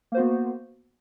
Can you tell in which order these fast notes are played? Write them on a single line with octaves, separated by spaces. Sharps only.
A#3 C5 F#4 B3